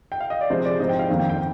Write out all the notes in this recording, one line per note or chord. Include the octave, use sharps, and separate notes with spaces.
G5
F5
D#5
D5
C3 F3 G#3 C4 C5
D5
G#2 F3 C4 D#5
G5
F5
F2 D#3 A#3
G5
G5